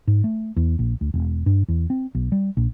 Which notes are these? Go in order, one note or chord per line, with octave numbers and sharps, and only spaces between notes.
G#2
A3
E2
A#1
D2
E1
G2
E2
C4
B1
G3
A#1